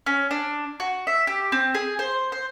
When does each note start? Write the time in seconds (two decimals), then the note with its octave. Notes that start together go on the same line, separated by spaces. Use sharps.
0.06 C#4
0.31 D4
0.80 F#4
1.07 E5
1.27 G4
1.52 C4
1.74 G#4
1.99 C5
2.32 C5